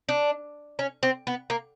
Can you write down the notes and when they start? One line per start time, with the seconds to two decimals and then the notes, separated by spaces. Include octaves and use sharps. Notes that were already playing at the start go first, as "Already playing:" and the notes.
0.09 D4
0.79 C#4
1.03 C4
1.27 B3
1.50 A#3